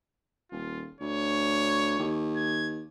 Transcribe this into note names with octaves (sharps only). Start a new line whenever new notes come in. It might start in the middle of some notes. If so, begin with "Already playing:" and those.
D#1 F4
D2 C#5
D#2
G#6